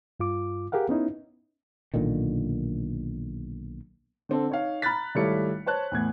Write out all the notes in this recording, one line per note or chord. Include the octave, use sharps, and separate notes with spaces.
G2 F4 D6
G4 G#4 A#4 F5 F#5
B3 C#4 D#4 E4
B1 A#2 D3 D#3
D3 C4 A4
D#4 C#5 F5
A#5 B5 F6 F#6 A6 B6
G#1 G3 A3 E4 C#5 C#7
C5 C#5 A5 F#6
E2 A2 G#6